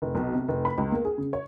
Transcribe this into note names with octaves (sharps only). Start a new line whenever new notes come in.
F1
B1
C3
F1
B5
C#2
A#3
G#4
C#3
C#5